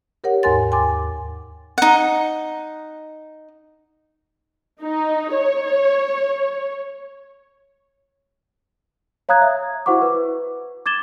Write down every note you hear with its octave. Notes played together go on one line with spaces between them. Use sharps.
G4 A#4 C#5 F#5
D#2 G#2 A#4 G#5 C6 A6
G5 G#5 C6 D6
D#4 F#5
D#4
C#5
C#5 F5 A#5 D#6 F#6 G#6
E5
E4 F#4 C5 F#5 C#6 D6
B4
D6 G#6 A6 E7 G7